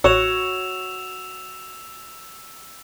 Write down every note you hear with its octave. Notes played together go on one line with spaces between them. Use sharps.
A1 F#4 C#5 E6 E7 F7